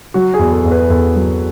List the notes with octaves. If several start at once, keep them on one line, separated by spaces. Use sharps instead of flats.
F#3 F#4
G#4
E2
A4
E2
B4
E2 A4
F#3